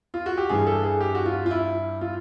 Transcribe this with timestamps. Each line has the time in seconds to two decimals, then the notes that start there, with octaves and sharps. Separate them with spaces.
0.14 F4
0.26 F#4
0.37 G4
0.49 G2 E3 G3 G#4
0.67 A4
0.84 G#4
1.01 G4
1.15 F#4
1.26 F4
1.46 F4
1.51 E4
2.01 F4